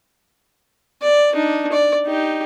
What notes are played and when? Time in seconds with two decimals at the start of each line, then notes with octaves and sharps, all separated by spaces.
1.02 D5
1.33 D4 D#4
1.72 D5
2.06 D#4 G4